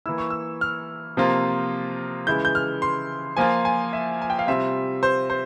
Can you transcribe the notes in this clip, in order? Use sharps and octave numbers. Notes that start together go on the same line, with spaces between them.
E3 A#3 E4 E6
C#6
E6
F6
C3 F3 A#3 F4
C#3 E3 G#3 E4 G6
G6
F6
C6
F3 A#3 F4 G#5
G#5
E5
G#5
G5
F5
C3 G3 C4 F4 E5
C5
C5